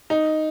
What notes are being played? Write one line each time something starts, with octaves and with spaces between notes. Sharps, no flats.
D#4